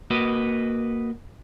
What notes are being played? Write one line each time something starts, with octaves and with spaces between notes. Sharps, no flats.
A#3 F#4 B4 D#5